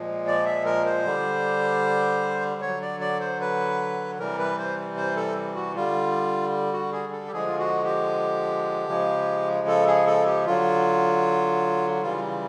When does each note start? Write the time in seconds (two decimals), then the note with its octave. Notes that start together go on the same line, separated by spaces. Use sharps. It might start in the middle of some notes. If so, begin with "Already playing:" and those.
Already playing: A#2 F3 G#3
0.27 D5
0.45 E5
0.65 A#4
0.85 C5
1.04 D3 G3
2.61 D3 C#5
2.67 F#3
2.81 D5
3.00 D5
3.20 C5
3.41 B4
4.19 C3 E3 G3 A#4
4.39 B4
4.58 C5
4.97 C5
5.16 A4
5.55 F#4
5.75 D3 G3 F4
6.73 F#4
6.92 G#4
7.12 A4
7.27 G4
7.32 D3 F3 G#3 G#4
7.47 F4
7.59 F#4
7.84 G4
8.89 C#3 F3 G#3
9.67 A4
9.87 G#4
10.07 A4
10.26 G4
10.45 D3 F#3 F4
12.02 C#3 E3 G3 F4